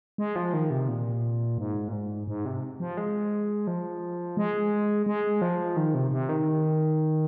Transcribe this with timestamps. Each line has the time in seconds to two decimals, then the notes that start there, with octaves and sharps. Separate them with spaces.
0.18 G#3
0.36 F3
0.53 D#3
0.71 C3
0.88 A#2
1.58 G#2
1.88 A#2
1.93 G#2
2.28 G#2
2.45 C3
2.80 F3
2.97 G#3
3.67 F3
4.37 G#3
5.06 G#3
5.42 F3
5.77 D#3
5.94 C3
6.11 C3
6.29 D#3